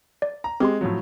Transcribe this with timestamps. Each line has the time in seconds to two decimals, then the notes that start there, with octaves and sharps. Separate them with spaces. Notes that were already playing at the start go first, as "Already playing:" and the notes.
0.22 D5
0.44 A#5
0.60 G#3 C4 G4 C6
0.81 A2 F3 F#3